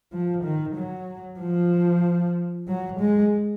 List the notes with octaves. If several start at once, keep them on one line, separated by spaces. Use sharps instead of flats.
F3
D#3
F#3
F3
F#3
G#3